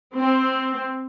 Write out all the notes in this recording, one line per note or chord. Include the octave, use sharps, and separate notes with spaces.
C4